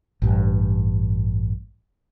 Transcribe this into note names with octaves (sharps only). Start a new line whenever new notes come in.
A1 G2